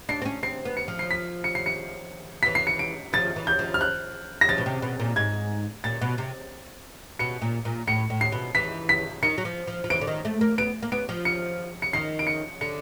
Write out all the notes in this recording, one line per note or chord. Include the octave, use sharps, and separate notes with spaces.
D4 C7
C4
C#4
C4 C7
B3
C#7
F3
C7
B6
C#7
C7
C#7
E3 B6
C7
C#7
D7
F3 A6
E3
G6
F3
F6
F#6
A#6
F3 A6
B2
C3
B2
A#2
G#2 G#6
A#2 A6
B2
C3
B2 C#7
A#2
A#2
A2 C#7
A2
C7
B2
E3 B6
B6
D#3 C#7
F#3
F3
F3
F3
E3 D7
D3
D#3
A3
A#3
B3 D7
A#3
B3 D7
F3
C#7
C#7
D#3 C7
D7
C#7
D3 C#7